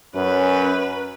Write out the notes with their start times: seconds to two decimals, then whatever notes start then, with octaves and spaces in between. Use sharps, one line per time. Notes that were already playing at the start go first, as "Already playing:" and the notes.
0.15 F#2 C#4 B4